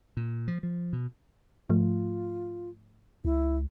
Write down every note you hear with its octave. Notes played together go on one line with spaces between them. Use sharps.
A#2
F3
F3
B2
G#2 F3 A3 F4
C#2 E4